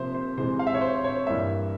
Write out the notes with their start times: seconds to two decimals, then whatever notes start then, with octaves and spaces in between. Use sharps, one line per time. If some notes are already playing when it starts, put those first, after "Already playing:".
Already playing: C3 F3 A#3 C5 E5
0.14 C5
0.38 C3 E3 G#3 C5
0.59 F5
0.67 E5
0.74 C#5
0.81 C5
1.04 C#5
1.27 G2 E3 A#3 E5